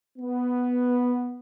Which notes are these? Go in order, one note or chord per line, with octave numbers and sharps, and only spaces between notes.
B3